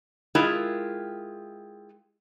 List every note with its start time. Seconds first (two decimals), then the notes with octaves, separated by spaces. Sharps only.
0.35 G#3 E4 F4 G4 G#4 A#4